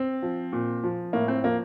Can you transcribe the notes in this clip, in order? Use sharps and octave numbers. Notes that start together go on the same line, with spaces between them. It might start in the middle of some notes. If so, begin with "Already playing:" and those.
Already playing: C4
F3
A#2
F3
A2 A#3
C4
F3 A#3